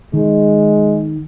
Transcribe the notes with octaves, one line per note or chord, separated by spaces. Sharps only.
D#3 G#3